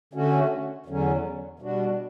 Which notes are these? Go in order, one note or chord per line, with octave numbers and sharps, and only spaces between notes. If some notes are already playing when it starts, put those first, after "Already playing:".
D3 A3 C#4 F#4
E2 D3 F#3 C#4
B2 G3 D4 F#4